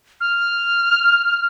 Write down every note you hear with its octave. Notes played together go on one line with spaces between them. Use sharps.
F6